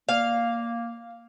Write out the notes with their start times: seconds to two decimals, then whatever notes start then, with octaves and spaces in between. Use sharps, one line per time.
0.09 A#3 F5